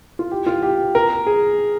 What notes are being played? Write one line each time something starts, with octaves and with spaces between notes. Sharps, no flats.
F4
G4
F4
G4
A#4
G#4